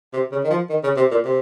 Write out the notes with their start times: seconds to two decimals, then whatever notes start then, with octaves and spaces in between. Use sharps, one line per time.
0.13 C3
0.32 C#3
0.44 D#3
0.50 F3
0.69 D#3
0.83 C#3
0.96 C3
1.11 A#2
1.25 C3